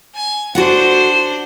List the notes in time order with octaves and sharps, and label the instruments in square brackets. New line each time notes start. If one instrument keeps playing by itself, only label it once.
[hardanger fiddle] G#5
[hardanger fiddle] D4 C5 [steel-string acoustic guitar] F#4 A4 F#5